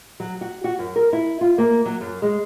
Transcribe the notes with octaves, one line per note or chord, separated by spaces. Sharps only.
F#3
F#4
F#4
F#2
A#4
E4
F4
A#3
F#3
F#2
G#3